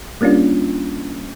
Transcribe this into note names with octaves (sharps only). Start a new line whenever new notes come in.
G3 A#3 C#4 D4 F4